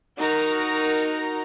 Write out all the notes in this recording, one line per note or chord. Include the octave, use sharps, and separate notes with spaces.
D#4 F#4 A#4 A#5